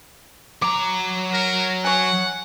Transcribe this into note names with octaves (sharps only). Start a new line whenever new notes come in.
F#3 A#5 D6
A#4
C#5 F#5 G#5